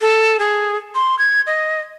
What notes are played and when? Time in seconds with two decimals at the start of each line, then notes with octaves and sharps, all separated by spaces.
0.01 A4
0.39 G#4
0.95 C6
1.19 G#6
1.47 D#5